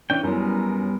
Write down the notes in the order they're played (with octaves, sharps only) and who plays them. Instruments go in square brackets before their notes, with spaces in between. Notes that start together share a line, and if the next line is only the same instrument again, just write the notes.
[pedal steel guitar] E3 C#4 G5 [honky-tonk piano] D4
[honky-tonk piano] F#2 E3 F#3 [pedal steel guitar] G3 B3 A#4